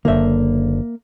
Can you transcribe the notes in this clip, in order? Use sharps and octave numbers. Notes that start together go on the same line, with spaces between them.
F#1 D3 A#3 E5